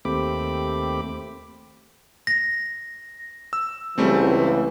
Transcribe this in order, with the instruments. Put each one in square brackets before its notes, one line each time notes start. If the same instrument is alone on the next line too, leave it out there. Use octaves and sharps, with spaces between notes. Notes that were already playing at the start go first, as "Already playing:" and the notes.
[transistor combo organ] D#2 A3 C4 G4 B5 D6
[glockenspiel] A#6
[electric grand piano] E6
[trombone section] C#2 E3 [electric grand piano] G3 A3 C4